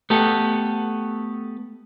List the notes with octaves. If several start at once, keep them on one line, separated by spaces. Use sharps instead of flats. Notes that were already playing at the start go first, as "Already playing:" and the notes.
A3 B3 G4 A4